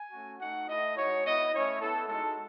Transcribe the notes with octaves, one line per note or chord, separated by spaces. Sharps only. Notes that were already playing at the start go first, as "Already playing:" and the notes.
Already playing: G#5
A3 C#4 F#4
A3 D#4 F#4 F#5
A3 E4 D#5
G#3 D#4 F#4 C#5
B3 E4 D#5
A3 C#4 E4 C#5
B3 E4 A4
G#3 D#4 F#4 A4